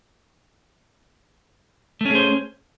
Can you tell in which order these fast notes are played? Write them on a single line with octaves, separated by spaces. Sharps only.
A3 C#4 G#4 C5